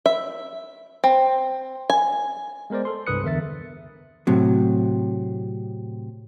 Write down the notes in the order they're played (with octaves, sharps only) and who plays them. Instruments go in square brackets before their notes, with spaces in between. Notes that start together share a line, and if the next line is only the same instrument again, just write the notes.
[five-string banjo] E5
C4
G#5
[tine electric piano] G#3 B3 A#4 C5 D5
A4 C6
C2 G2 B4 D#6 F#6 C#7
E2 D3 A#4 E5 A6
[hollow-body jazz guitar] A2 C3 F#3